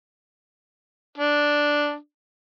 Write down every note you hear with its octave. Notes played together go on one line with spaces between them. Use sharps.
D4